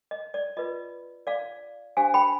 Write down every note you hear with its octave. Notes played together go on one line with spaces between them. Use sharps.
D#5
D5
F4 B4 D#5
D5 F5
D4 G4 C5 F5 G#5
G5 B5